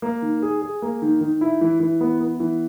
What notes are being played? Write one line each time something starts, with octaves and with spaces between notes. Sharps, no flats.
A#3
D#3
G#4
G#4
A#3
D#3
D#3
E4
E3
E3
B3
B3
E3